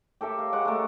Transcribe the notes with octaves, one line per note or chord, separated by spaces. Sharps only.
G4 A4 A#4 E5
F5
G#3 F#5 C#6 D6
A3 A#4